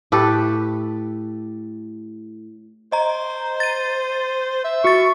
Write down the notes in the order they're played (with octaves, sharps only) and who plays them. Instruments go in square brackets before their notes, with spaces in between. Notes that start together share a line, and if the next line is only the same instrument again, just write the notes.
[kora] A2 G4 A4 B4
[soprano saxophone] C5 [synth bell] D#5 A#5
[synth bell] A6 D#7
[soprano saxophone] E5
[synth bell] F#4 A6 [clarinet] C#6